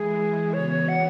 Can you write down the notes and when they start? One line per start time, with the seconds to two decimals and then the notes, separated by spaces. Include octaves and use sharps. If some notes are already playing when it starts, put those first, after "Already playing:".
Already playing: E3 G#3 E4 G#4
0.53 C#3 E3 B3 F#4 C#5
0.88 F#5